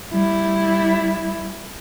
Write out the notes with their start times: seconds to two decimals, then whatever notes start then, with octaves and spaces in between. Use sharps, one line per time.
0.12 G3 E4